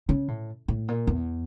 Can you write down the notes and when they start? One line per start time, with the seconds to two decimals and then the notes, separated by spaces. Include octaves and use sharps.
0.09 C#3
0.28 A2
0.68 A2
0.88 A#2
1.07 E2